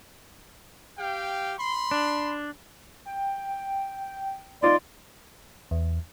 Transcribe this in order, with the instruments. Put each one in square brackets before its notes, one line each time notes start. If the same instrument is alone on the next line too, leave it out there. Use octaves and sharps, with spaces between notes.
[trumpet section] G4 F5 G5
B5 C6
[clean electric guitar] D4
[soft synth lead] G5
[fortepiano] D#4 F4 [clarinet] D5 [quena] C6
[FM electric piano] E2